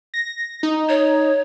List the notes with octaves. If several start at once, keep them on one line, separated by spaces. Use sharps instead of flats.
A#6
D#4
C#5